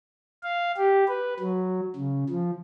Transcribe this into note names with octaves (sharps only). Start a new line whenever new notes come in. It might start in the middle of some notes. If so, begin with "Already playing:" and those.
F5
G4
B4
F#3
C#3
F3